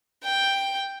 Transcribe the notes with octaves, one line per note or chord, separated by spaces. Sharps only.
G5